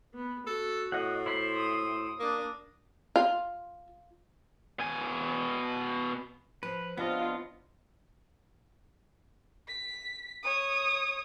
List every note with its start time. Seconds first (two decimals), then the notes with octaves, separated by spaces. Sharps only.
0.15 B3
0.46 F#4 A4
0.92 A2 D#5 F#5
1.26 E4 C5 B5
1.56 D#6
2.20 A#3 D4 D#6
3.16 F4
4.80 B2 G#5
6.63 F3 B4
6.98 B3 C4 D4 F4 D#5
9.68 B6
10.43 C#5 D#6